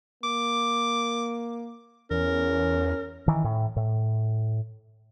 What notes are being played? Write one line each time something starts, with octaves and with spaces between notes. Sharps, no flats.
A#3 D6
E2 C#4 A#4
D#3 E3
A2
A2